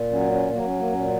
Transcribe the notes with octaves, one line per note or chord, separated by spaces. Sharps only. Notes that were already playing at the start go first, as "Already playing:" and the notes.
Already playing: A#2
F#3 C#4
C#4
F#3 A#3
C#4
A#3
A#2 C#4